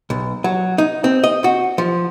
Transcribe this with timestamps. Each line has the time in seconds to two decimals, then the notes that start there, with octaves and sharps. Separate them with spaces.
0.10 B1
0.44 F#3
0.78 D#4
1.04 C4
1.24 D#5
1.44 F#4
1.78 F3